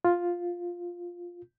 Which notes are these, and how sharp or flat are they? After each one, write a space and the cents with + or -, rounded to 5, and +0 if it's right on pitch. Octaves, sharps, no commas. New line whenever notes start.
F4 +5